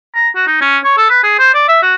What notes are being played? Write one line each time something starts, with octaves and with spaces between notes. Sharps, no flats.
A#5
F#4
D#4
C#4
C#5
A4
B4
G#4
C5
D5
E5
F#4